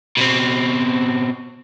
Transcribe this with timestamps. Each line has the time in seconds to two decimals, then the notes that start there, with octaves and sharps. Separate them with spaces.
0.18 B2 C4